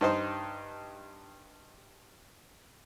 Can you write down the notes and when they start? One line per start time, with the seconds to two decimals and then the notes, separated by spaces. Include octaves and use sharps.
0.01 G2 D#4 C5